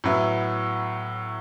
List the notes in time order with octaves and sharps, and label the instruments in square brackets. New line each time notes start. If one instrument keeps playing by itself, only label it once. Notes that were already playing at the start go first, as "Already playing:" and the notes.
[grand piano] A2 F#3 B3 E4